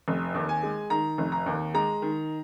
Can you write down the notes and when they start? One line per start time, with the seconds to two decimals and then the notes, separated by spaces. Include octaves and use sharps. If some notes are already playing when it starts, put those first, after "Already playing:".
0.08 F1
0.34 D#2
0.49 G#5
0.63 G#3
0.90 D#3 A#5
1.18 F1
1.32 A#5
1.46 D#2
1.74 G#3 A#5
2.02 D#3